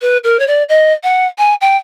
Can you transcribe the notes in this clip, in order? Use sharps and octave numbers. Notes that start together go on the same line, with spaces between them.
B4
A#4
C#5
D5
D#5
F#5
G#5
G5